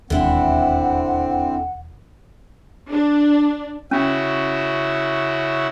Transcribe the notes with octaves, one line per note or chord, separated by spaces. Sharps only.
E1 D#2 D3 C4 E4 F#5
D4
C#3 C#4 E4 F#4